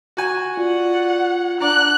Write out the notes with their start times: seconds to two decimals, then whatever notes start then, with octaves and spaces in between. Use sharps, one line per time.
0.17 F#4 G#5
0.57 F4 D5 F#5
1.60 D4 D5 F#5 A#5 F#6